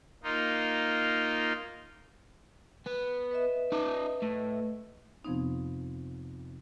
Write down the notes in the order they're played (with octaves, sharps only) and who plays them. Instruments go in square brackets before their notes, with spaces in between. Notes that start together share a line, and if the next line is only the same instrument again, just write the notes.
[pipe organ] A#3 D#4 F4
[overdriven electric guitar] B3
[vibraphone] B4 D#5 E5
[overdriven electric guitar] D#4 D5
A2
[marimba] F2 C3 F3 B3 C4 D#4